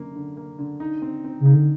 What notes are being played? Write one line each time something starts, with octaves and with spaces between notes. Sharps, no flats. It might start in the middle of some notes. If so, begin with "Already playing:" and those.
Already playing: F#2 D3 A#3
D3
A#3
D3
D#4
C4
C4
C#3
D#4
D3